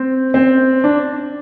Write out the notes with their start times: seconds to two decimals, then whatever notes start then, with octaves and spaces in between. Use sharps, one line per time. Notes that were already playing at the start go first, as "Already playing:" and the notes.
Already playing: C4
0.34 C4
0.84 D4